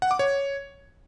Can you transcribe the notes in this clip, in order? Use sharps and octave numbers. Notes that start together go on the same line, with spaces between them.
F#5
D6
C#5